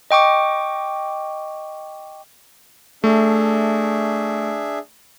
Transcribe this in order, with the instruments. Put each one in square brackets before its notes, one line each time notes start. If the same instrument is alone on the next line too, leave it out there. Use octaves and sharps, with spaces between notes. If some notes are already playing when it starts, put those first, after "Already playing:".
[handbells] D#5 G5 C#6 D6
[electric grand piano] A3 [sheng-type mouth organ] D4 G#4 E5